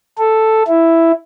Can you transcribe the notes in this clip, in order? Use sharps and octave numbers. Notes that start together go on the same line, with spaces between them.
A4
E4